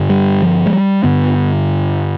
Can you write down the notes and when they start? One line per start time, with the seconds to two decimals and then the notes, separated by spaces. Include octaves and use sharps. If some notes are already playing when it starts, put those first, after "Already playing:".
Already playing: G2 D3
0.10 G3
0.42 F3
0.66 G#3
0.73 G3
1.03 G2 D3 B3